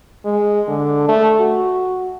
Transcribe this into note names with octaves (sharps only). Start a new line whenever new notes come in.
G#3
D3
A3
F#4